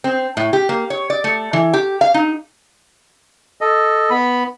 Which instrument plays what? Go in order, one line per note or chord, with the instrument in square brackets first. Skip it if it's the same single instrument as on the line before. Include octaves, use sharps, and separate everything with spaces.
[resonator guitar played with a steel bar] C4
A2
G4
A#3
C#5
D5
A3
E3
G4
F5
D#4
[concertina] A4 D#5
B3 B5